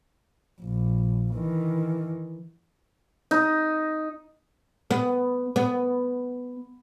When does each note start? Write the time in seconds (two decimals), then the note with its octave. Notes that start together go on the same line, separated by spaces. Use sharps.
0.61 A#1
1.33 D#3 E3
3.31 D#4
4.91 B3
5.56 B3